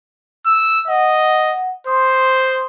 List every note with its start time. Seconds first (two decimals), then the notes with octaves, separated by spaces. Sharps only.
0.46 E6
0.88 D#5 F#5
1.87 C5 C6 D#6